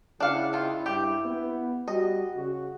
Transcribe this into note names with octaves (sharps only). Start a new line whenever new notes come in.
C#3 D4 E4 F5 F#5
D#3 F4
G2 E4 G4
B3
G3 F#4 D#5
C#3 F#4